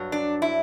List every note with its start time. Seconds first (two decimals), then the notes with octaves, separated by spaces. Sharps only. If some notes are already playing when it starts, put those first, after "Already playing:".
Already playing: G2 F#3
0.12 D4
0.42 E4